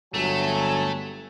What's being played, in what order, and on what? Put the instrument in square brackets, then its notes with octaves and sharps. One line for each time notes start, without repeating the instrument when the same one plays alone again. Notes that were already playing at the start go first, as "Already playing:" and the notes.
[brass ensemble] G1 F#3 G#5 [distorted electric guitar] A3